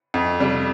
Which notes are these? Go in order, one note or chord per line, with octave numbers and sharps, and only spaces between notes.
F2
C3 G3